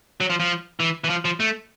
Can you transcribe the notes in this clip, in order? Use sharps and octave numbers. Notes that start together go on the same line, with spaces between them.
F#3
F3
F3
E3
E3
F3
F3
A3